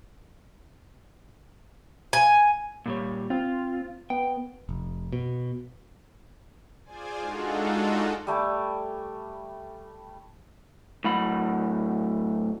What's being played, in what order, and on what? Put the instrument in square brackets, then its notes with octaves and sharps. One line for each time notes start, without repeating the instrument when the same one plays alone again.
[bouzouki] G#5
[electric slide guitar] A#2 G3 C#5
[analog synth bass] C4 [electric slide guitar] F4
[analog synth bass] B3 [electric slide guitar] G5
[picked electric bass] F1
B2
[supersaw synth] F4 G#4 C5 D5 G#5
G#3 D4 D#4 F4 F#4 A4
[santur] G3 A3 G#5 D6
[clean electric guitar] A2 F#3 B5